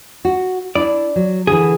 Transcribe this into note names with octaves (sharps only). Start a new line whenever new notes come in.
F#4
D4 E4 D5
F#3
D3 E3 G#4